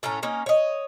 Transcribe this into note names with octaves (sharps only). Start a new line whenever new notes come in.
A2 A3 C#4 A#5
A#3 C#4 D#4
C#5 D#5